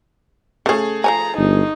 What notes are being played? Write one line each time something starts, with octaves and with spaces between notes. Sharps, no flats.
C#3 A3 C#4 G#4
F3 C#5 G#5 A#5
G1 D#4